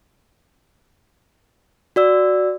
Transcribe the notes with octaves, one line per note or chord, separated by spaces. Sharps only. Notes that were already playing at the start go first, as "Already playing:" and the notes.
F#4 D5 E6